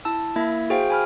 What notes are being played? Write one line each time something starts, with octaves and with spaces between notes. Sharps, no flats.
E4 A5 E6
A#3 E4 E5 G#6
F#4 G#4 C5 F5 G5
G#5 B5 F6